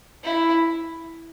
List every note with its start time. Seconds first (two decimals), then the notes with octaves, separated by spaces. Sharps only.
0.24 E4